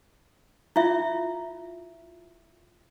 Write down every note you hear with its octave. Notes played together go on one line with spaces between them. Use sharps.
E4 F4 E5